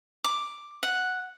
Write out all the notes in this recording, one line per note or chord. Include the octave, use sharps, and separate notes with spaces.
D6
F#5